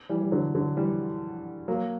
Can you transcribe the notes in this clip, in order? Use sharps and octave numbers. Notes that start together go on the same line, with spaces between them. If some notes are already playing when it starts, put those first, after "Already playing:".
E3 G3
G3
D3 F#3
D3 F#3
E3 G3
F#3 A#3